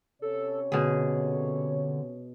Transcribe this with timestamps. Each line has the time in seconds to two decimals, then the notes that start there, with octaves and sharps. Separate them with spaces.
0.22 C3 C#4 A4 C#5
0.72 B2 D3 G#4